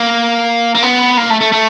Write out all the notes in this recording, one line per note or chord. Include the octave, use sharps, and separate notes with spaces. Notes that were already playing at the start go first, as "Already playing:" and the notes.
Already playing: A#3
A#3
B3
A#3
A3
A3
A3